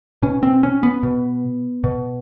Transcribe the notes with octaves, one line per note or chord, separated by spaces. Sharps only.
B2 C#4
C4
C#4
B3
B2
B2